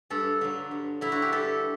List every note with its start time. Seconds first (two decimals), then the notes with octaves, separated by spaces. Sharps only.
0.10 G2 A4
0.41 D3 F#3
0.71 G2
1.01 D3 F#3 E4
1.12 F#4
1.22 G4
1.32 G2 A4